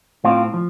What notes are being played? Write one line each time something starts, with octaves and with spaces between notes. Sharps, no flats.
A2 C4 F4
F3